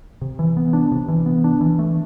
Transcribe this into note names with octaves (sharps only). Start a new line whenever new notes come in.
C3
E3
B3
D4
C3
E3
B3
D4
E3
A3